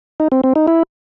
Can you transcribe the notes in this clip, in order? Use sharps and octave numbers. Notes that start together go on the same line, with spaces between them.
D#4
C4
C4
D#4
E4